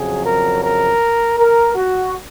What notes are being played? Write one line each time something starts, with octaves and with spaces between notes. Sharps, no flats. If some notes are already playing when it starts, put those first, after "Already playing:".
Already playing: F2 C#3 F#3 G#4
A#4
A#4
A#4
F#4